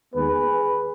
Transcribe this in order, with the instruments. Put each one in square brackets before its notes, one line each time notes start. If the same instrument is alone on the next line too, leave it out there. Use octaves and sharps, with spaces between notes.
[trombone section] D#2 D#3 G#3 B3 G#4 B4